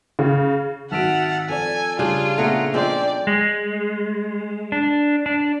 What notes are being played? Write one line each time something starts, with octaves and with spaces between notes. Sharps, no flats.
C#3
G#1 F#4 E5 F#5 A5 F6 D7
F3 C4 A4 D5 G#5
C#3 G3 D4 F4 G#5
A#2 A3 B3 G#4 F#5 A#5
F3 G#3 C4 D5 G5
G#3
D4
D4